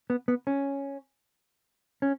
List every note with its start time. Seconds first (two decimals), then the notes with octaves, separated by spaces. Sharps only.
0.10 B3
0.28 B3
0.47 C#4
2.02 C#4